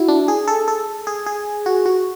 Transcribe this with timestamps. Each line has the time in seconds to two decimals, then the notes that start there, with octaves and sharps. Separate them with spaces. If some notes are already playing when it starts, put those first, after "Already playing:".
Already playing: E4 F#4
0.08 D4
0.28 G#4
0.48 A4
0.68 A4
1.07 G#4
1.26 G#4
1.66 F#4
1.86 F#4